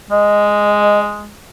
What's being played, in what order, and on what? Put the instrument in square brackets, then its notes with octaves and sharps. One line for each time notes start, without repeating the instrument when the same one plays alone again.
[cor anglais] G#3 [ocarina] D#5